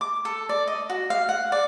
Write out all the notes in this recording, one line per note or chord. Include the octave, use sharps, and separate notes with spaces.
D6
A4
D5
D#5
F#4
F5
F#5
D5